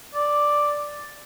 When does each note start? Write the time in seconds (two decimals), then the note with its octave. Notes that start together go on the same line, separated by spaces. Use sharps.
0.15 D5